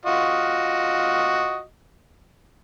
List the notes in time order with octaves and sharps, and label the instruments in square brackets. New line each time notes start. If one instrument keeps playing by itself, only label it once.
[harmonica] F4 F#4 D#5